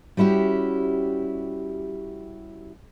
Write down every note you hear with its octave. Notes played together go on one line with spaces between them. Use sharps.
G3 C#4 E4 F#4 G4